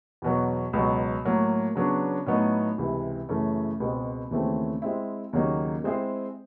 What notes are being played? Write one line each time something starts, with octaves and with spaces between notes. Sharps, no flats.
E2 B2 F#3
C#2 B2 F#3
A2 F#3 A#3
C#3 F#3 B3 D4
A2 F#3 B3 D#4
C#2 C3 E3
F#2 C#3 E3 A3
C#2 B2 G#3 C4
D#2 C#3 E3 A3 C4
G#3 C4 E4
D#2 C#3 F#3 A#3 D#4
G#3 C4 E4 G#4 C5